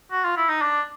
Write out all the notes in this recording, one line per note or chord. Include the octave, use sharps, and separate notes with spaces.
F#4
F4
E4
D#4
D4